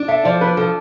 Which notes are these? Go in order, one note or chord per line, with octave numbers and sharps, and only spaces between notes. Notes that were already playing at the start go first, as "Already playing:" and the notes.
Already playing: D4
A4 E5
F3 D5
D4 B4
F3 A4